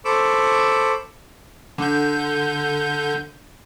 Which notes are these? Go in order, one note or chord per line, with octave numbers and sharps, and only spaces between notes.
A4 C5 B5 C#6 D6 E6
D3 D4 G6